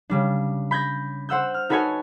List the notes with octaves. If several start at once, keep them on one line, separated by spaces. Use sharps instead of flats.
C#3 G3 D4
B5 G6 G#6 A#6
C5 F#5 E6 G6
F6
D#4 F#4 A4 B4 C#5 G#5